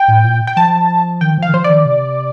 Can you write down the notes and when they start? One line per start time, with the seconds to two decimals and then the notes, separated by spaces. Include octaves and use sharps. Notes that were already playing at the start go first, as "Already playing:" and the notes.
Already playing: G5
0.08 A2
0.24 A#2
0.47 G5
0.56 F3 A5
1.21 D#3 G5
1.38 F3 F5
1.49 D#3
1.54 F3 C5
1.64 D5
1.70 D#3
1.85 C3